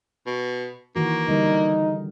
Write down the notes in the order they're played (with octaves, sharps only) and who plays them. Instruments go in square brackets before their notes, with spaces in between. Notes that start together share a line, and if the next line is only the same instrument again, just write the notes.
[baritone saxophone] B2
[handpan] D#3 E3 F#4 [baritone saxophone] A#3
[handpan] D3 G3 A#4 [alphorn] D#4